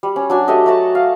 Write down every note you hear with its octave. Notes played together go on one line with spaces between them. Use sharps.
G3
C#4
F#3 D4 G#5
A3 G4 A4 D#5
F#3 A3 F#4 A5
F5